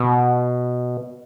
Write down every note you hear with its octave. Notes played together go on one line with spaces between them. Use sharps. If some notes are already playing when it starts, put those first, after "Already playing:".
Already playing: B2